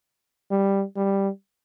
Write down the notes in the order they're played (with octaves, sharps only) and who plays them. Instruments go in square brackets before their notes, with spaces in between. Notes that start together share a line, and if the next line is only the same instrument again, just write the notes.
[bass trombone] G3
G3